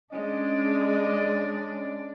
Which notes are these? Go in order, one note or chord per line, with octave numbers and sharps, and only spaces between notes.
G#3 C#4 D4 D5 D#5